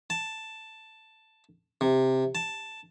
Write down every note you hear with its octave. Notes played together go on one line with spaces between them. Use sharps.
A5
C3
A5